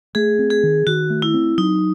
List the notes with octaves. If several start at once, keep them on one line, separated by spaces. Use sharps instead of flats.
A3 G#4
C4
G#4
D#3
D#3 F#4
A3
E4
C4
F#3 D#4